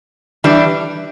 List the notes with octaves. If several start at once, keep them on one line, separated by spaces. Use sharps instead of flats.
E3 G3 D4